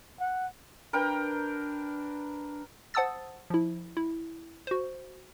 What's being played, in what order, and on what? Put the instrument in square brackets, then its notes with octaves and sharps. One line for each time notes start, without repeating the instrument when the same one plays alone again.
[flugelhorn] F#5
[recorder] D4 [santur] A#4 B4 G5
[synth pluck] C5 F#5 A5 D#6 E6 A6
F3 E4
E4
F#4 C5